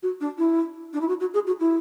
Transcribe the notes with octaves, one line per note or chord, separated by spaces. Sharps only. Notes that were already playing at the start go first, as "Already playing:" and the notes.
F#4
D4
E4
D4
E4
F#4
F#4
G#4
F#4
E4